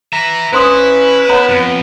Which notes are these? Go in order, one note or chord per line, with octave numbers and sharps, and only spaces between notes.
B4 E5 A#5
C#4 E4 B4 C5 C6 D#6
B3 C#5 A#5 B5
F2